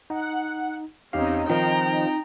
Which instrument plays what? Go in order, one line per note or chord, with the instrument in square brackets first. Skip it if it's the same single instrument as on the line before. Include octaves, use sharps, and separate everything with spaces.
[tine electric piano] D#4 [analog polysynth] F#5
[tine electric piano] E2 G4 F5 [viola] C4 C#4 [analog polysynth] D#4
[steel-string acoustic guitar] D#3 F3 F4 [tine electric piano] C4 [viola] G5 A#5